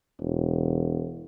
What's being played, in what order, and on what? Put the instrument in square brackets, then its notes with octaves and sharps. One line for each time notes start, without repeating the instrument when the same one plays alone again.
[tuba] E1